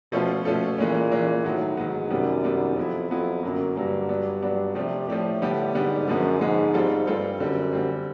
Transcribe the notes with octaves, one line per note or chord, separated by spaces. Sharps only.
B2 F3 A3 C#4 F4 A4
B2 F3 A3 C#4 F4 A4
A#2 E3 G#3 C#4
E3 G#3 C#4
A2 D#3 F#3 B3
G#2 D#3 F#3 B3
F#2 C3 D#3 G3 B3 D4
C3 D#3 G3 B3 D4
F2 F#3 B3 E4
F2 F#3 B3 E4
F#2 D3 F#3 A#3
G2 D3 F#3 A#3
F#3 B3 D4
F#3 B3 D4
C3 F3 A3 D4 G4
A2 F3 A3 D4 G4
D3 G3 B3 D4 G4
G#2 D3 G3 B3 D4 G4
F#2 D3 F3 G#3 B3
G#2 D3 F3 G#3 B3
G3 C4 F4 A4
G2 G3 C4 F4 A4
F#2 D3 G3 C4
D3 G3 C4